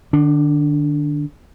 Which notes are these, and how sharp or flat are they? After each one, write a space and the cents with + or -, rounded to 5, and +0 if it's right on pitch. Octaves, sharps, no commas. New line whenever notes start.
D3 +40 D4 -10